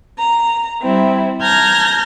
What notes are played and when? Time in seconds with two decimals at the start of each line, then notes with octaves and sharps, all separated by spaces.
0.16 A#5
0.81 G3 C4 E4
1.42 A5 A#5 F6 G6 G#6 A#6